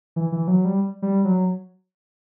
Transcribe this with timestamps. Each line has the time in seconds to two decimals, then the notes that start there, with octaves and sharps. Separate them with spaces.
0.16 E3
0.32 E3
0.48 F#3
0.65 G3
1.02 G3
1.25 F#3